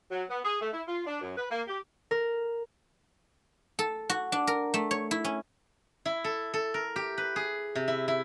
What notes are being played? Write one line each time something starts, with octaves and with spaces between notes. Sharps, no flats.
F#3
B3
G#4
A3
E4
F4
D4
F#2
B4
A#3
G4
A#4
A4
F#4
D4
A#4
A3
C#5
E4
C#4
E4
A4
A4
A#4
G4
B4
G#4
C3
E4
E4